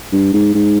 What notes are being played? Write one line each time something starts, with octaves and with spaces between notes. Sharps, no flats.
G2
G#2
G#2